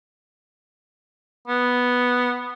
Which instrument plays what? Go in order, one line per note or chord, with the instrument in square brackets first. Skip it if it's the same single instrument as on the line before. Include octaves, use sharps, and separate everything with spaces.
[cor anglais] B3